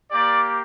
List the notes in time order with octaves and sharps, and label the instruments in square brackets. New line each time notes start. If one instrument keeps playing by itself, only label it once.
[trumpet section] A#3 G4 D5